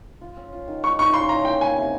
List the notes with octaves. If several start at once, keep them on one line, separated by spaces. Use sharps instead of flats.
F4
C#4
F4
D#3
G#3 C#6
D#4 C#6
C#3 C6
C#3 A#5
A#3 G5
A#3 G#5
C3